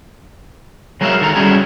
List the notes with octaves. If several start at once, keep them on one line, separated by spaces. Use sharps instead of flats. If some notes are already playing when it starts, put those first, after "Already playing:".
F#3 G#3 F#4 A#4 E5 F5
D#3 A4 A#5
G3 C#4 E4 F#4 G#4